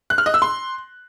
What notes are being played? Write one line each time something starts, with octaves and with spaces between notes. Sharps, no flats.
F#6
F6
D#5
E6
C6